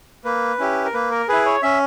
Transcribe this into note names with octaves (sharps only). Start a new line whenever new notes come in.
A#3 B4
C#4 E4 G4
A#4
A#3 B4
A#4
E4 G#4 B4
C#5
C#4 E5